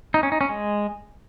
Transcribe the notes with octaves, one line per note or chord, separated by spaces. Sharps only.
D#4
C#4
D#4
C#4
G#3